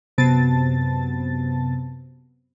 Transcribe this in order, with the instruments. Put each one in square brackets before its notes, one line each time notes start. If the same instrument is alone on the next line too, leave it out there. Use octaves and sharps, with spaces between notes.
[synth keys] F#2 C3 B3 A5 A6